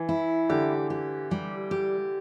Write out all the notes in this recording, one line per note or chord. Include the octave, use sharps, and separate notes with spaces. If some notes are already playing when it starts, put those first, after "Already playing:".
Already playing: E3
E4
D3 G4
G4
G3
G4